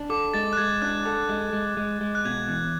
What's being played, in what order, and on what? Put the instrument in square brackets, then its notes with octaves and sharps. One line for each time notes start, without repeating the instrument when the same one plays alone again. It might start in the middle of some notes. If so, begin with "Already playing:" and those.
Already playing: [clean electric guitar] D4
[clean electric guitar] A4 [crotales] D6
[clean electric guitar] G#3 [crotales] A6
[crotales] F#6
[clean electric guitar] G#3 [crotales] G#6
[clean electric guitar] D4 [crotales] F#6
[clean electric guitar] A4
G#3
G#3
G#3
G#3
[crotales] F#6
[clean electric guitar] B2 [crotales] G#6
[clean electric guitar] E2